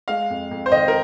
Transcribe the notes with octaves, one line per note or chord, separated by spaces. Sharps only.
G#3 F5
F2
F2
C5
D#3 D#5
A#4